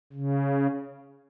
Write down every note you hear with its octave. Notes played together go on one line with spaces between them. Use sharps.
C#3